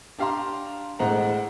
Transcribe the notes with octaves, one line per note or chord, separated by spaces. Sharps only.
D4 G4 F5 A#5 C6
A1 A2 G#3 C5 F#5 A#5